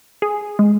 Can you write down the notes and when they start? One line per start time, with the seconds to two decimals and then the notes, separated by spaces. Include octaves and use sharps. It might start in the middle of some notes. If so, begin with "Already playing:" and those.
0.22 G#4
0.59 G#3